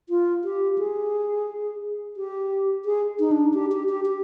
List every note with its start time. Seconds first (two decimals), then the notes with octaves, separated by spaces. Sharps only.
0.09 F4
0.44 G4
0.78 G#4
2.17 G4
2.85 G#4
3.20 D#4
3.31 D4
3.54 G4
3.72 G4
3.89 G4
4.06 G4